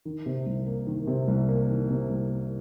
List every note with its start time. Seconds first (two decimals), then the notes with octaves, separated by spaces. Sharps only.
0.05 D#3
0.26 C3
0.46 C2
0.66 A#3
0.87 D#3
1.07 C3
1.28 C2
1.49 A#3
1.69 D#3
1.90 C3
2.10 C2
2.30 A#3